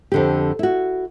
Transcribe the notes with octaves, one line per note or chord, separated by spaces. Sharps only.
F2 D3 G4
E4 F#4